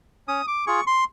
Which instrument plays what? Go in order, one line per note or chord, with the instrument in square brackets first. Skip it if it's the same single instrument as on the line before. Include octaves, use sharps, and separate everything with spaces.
[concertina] C#4 D#6
D6
F4 G#4 C#6
C6